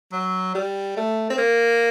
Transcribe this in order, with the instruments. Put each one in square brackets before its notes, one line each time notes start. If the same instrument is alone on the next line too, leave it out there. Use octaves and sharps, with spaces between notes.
[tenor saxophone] F#3
G3
A3
C4
A#3